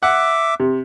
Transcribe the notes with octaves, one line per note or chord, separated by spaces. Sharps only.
E5 F#5 D6
C3